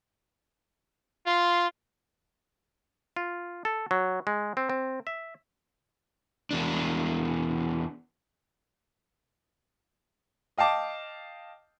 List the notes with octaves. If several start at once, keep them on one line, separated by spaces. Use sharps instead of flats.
F4 C6
F4
A4
F#3
G#3
C4
C4
E5
E2 D4
D#5 F5 G5 A5 D6